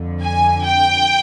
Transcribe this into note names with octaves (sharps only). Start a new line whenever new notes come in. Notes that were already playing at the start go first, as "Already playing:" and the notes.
Already playing: F2 D3
G#5
G5